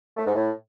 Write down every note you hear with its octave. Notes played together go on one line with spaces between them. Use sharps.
A3
G#2
A2